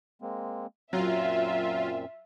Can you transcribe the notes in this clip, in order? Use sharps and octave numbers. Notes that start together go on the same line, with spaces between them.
G#3 A#3 C4
F#2 A#2 F#3 C4 F4 E5